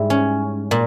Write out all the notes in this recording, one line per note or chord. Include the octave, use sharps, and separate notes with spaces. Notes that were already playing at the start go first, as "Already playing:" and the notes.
Already playing: G#2 G3 E4
C#4
A#2